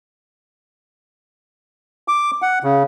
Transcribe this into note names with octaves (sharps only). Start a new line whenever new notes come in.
D6
F#5
C#3